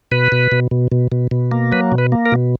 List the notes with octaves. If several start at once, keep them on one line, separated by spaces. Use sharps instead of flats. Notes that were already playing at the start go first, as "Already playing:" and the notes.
B2 B4
B2
B2
B2
B2
B2
B2
A#3
F#3 B4
B2
B4
A#3
A#4
B2